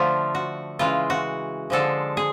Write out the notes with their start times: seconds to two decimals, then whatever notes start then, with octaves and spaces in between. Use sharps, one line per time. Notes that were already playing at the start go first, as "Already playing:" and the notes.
Already playing: D3 F3 A3 F4
0.35 F#4
0.79 C#3 E3 G#3 F4
1.10 F#4
1.70 D3 F3 G#3 A4
2.17 G#4